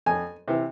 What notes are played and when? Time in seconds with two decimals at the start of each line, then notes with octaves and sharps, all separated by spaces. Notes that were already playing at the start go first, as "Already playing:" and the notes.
0.06 F2 G#5
0.48 C3 E3